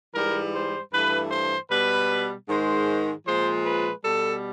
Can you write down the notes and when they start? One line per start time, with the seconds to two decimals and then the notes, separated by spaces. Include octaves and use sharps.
0.14 G#2 E3 G3 A#4
0.54 C5
0.92 G2 E3 A3 B4
1.31 C5
1.70 B2 G3 B4
2.48 G#2 D#3 G#3 C5
3.27 A#2 F3 G#3 C5
3.65 B4
4.04 B2 G3 A4